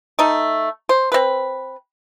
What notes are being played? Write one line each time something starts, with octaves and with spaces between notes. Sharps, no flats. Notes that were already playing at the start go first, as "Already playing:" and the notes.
A3 D#4
C5
C4 B4